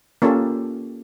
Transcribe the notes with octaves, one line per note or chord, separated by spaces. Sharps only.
A#3 C#4 F4 G4 A4